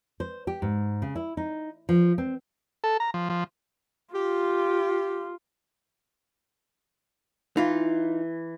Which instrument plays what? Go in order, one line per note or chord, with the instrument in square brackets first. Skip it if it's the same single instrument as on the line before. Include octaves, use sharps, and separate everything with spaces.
[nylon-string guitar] C5
G4
G#2
C#3
E4
D#4
F3
C4
[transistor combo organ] A4
A#5
F3
F3
[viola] F4 [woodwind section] G4
[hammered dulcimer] E3 [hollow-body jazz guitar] D#4 F4